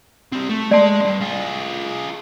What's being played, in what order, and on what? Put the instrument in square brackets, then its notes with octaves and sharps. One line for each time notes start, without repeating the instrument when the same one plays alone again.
[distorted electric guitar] G3 C4
A3
[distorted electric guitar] G#3 C6 [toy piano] D5 A5
[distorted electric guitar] G2 C3
F4 G#4